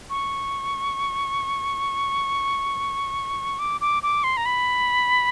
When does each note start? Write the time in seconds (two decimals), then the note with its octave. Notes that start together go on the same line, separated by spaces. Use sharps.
0.10 C#6
3.59 D6
3.81 D6
4.03 D6
4.24 C6
4.37 A#5
4.46 B5